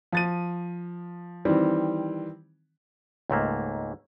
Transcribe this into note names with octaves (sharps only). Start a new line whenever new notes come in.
F3 A6 D#7
D#3 E3 G3 C4
C#2 G#2 A3 A#3